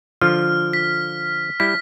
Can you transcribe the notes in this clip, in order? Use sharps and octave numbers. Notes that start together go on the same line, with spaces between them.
D3 F3 F4 F6
B6
G3 E4 B6